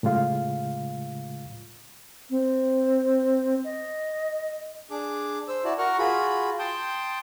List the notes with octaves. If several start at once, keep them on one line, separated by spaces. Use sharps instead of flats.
A2 C#3 G#3 F4 F5
C4
D#5
D4 G#4 D6
C5 E6
E4 F#4 D5 A5
F#4 A#4 F#5 C#6 F6
F4 F#4 G#4 B5
G5 A5 C6 D#6 G6